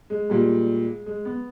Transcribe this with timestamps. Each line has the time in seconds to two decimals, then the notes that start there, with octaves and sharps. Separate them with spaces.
0.10 G#3
0.30 A#2 G3
1.06 G#3
1.25 B3